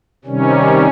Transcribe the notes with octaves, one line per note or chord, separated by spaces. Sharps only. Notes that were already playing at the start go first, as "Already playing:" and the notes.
C3 D#3 G3 C#4